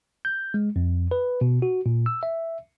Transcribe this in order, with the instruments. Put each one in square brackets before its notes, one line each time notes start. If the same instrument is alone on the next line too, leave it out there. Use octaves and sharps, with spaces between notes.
[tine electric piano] G6
G#3
F2
B4
B2
F#4
A#2
E6
E5